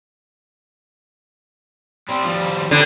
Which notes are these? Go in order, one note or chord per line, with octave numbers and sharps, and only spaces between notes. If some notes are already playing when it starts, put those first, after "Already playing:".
G3 C4
F3 G3
D3 G3 B3